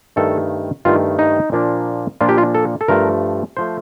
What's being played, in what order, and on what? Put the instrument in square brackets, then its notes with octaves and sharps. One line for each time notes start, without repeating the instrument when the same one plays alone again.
[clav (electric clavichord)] G2 D#3 A3 A4
G2 D#3 A3 F4
D#4
A#2 F3 A#3 D4
A#2 F3 A#3 D4 F4
G4
F4
A4
A4
G2 F3 A3 A#4
F3 A3 C5